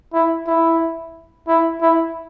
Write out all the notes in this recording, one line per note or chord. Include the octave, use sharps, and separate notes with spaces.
E4
E4
E4
E4